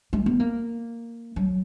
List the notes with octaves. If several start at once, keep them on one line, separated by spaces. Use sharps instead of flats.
G#3
B3
A#3
F#3